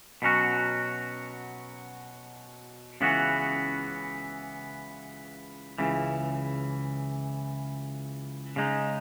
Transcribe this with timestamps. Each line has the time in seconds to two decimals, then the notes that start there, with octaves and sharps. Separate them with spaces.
0.22 B2 F#3 C#4 F#4
3.01 C#2 C#3 E3 B3 F#4
5.78 C#2 C#3 E3
8.56 C#3 G#3 D#4